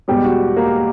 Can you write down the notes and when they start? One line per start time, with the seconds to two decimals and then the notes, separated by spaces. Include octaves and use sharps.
0.08 E2 B2 G3 G#3 G4
0.24 F#4
0.57 A#3 A#4